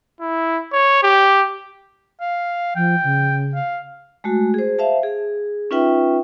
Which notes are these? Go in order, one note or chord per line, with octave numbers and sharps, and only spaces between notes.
E4
C#5
G4
F5
F3 G5
C#3
F5
G#3 A3 F#4
G#4 C5
C5 E5 F5 A5
G#4
C#4 D#4 F4 B4 E5 G5